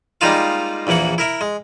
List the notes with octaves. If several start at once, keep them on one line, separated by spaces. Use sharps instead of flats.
G3 G#3 A#3 D#4 F4 F5
A#1 E2 E3 A#3 F#5
E4 A#4 E5
G#3